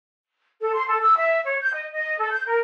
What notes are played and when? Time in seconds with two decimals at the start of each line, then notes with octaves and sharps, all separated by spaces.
0.61 A4
0.74 C6
0.88 A4
1.01 E6
1.16 E5
1.45 C#5
1.61 G6
1.73 D#5
1.92 D#5
2.19 A4
2.32 G6
2.47 A#4